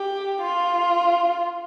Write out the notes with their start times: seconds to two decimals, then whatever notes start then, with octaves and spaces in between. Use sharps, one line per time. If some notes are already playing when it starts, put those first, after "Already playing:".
Already playing: G4
0.42 F4